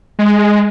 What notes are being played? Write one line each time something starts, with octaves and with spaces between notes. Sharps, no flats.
G#3